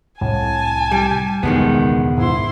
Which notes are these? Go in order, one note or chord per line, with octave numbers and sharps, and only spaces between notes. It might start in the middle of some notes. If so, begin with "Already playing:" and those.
C2 A2 G#5 A5
G3
E1 C#2 D3 D#3 G#3 B3
G#2 E4 C6